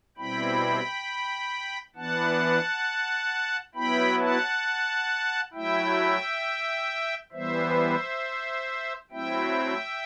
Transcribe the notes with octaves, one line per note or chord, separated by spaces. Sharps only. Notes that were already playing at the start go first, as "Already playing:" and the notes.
B2 G3 C4 E4 G5 B5
E3 B3 D4 F#5 A5
F#3 B3 E4 G5 B5
F#5 A5
F#3 A3 E4 E5 G5
E3 G3 B3 C5 E5
F#3 A3 C4 E4 E5 G5